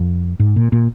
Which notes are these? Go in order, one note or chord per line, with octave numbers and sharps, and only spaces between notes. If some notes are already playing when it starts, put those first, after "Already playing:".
Already playing: F2
G#2
A#2
A#2